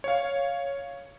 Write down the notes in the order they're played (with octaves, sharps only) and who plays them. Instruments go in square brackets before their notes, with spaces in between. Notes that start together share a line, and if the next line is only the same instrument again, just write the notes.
[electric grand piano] C#5 F5